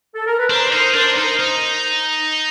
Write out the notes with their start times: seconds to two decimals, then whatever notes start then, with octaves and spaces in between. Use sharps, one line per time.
0.15 A4
0.27 A#4
0.39 B4
0.49 D4 A#4 C5
0.72 D#4 A#4 C5
0.94 D4 A#4 C5
1.17 D#4 A#4 C5
1.40 D#4